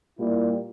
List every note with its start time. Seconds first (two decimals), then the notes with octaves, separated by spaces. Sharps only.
0.19 A#2 G3 A#3 E4